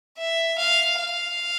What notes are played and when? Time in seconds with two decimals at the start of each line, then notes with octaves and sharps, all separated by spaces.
0.18 E5
0.58 F5
0.98 F5